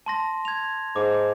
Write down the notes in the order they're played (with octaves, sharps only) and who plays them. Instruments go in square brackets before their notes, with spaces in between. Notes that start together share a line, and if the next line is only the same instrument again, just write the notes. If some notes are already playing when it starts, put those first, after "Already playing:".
[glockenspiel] A5 C6 A#6
G#6 F7
[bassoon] G#2 [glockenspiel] D6